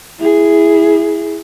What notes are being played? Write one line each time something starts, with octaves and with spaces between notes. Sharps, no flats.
E4 G#4